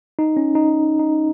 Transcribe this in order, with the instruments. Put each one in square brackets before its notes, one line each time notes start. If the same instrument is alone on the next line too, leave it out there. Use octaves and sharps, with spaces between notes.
[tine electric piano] D#4
C#4
D#4
D#4